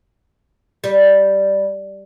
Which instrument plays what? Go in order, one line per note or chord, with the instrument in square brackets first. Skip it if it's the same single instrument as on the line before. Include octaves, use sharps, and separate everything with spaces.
[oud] G3